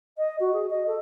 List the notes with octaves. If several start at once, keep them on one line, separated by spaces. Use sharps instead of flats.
D#5
F#4
G#4
D#5
A4